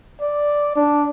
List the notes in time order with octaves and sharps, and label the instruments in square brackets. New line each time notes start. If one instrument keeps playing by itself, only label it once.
[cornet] D5
D4